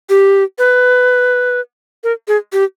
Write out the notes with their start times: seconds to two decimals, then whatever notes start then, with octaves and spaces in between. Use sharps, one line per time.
0.10 G4
0.59 B4
2.04 A#4
2.28 G#4
2.53 G4